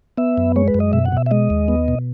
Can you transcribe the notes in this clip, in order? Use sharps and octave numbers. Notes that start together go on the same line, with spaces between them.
B3 E5
F#2
G#3 C#5
B4
F#2
D#5
B2 E5
F#5
B2 E5
E5
G#3 D#5
D#2
B3
B2